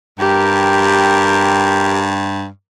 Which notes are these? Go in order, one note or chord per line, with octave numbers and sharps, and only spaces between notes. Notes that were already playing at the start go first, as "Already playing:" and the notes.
G2 G4 A#4